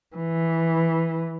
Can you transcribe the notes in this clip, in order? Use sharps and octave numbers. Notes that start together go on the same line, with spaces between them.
E3